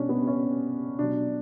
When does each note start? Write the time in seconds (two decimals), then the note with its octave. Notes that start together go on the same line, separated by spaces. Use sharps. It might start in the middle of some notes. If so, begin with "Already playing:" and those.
Already playing: B2 G3 C#4 D4
0.09 B3
0.27 C#4
0.99 B2 F#3 D4